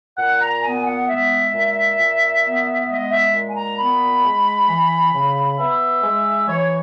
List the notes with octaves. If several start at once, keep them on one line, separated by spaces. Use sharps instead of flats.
A#2 F#5
A#5
B3 G#5
F#5
G#3 E5
A#2
A#2
B3
G#3 D#5
E5
A#2
G#5
A#5
B3 B5
G#3
E3
C#3
B3 E5
G#3
E3 C#5